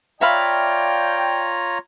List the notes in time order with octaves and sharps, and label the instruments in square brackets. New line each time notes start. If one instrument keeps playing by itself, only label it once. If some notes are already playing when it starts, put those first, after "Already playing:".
[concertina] F4 C#5 A#5 [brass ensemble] D5 G5 [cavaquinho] E5 F5 B5